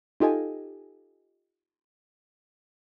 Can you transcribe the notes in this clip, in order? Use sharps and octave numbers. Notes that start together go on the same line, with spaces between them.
D#4 F4 G4 A4 D#5 G#5